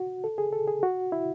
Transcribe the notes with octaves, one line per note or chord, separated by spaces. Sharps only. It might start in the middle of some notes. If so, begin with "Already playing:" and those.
Already playing: F#4
A4
G#4
A4
G#4
F#4
E4